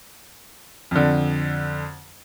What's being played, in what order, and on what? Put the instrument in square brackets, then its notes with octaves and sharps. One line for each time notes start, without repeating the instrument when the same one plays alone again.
[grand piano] F2 D3